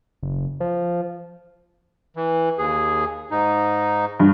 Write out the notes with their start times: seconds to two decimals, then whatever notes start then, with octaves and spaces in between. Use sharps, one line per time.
0.23 F#1
0.60 F3
2.16 E3
2.58 D#2 G#4
3.31 G#2 D#4
4.20 G2